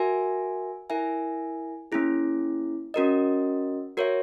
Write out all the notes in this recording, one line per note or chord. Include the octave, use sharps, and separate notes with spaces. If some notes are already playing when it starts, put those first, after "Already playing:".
Already playing: F#4 A#4 E5 G#5
E4 A#4 E5 G#5
A#3 C#4 E4 G#4
C#4 F#4 A#4 D#5
F#4 A#4 C#5 E5